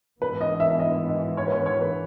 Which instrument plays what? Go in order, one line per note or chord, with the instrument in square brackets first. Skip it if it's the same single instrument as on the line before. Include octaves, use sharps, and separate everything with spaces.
[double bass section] G#2 E3 B3 [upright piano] B4
[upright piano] D#5
E5
E5
D#5
D#5
C#5
B4
C#5
C#5
B4